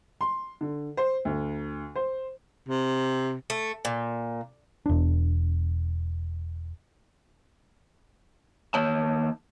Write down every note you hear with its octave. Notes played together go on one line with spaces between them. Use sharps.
C6
D3
C5
D2
C5
C3
A3
A#2
E1 D4
D#2 C#5 A5